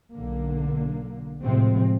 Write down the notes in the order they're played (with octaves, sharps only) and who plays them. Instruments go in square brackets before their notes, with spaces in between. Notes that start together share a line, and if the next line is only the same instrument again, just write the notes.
[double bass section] B1 D3 A#3
A2 C3 F3 G#3 C4